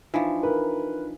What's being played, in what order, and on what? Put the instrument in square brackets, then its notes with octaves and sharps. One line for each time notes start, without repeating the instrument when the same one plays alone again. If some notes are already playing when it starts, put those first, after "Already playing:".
[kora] E3 F3 [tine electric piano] D4 D#4 F4
[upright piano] A#4 B4